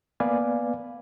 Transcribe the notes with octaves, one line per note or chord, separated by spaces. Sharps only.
A#3 B3 B4 D5 F5 G#5